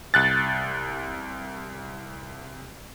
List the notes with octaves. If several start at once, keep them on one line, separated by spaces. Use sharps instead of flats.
C2 F#6 A6